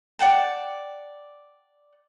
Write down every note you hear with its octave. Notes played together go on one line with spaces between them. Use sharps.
D5 F#5 G5 A5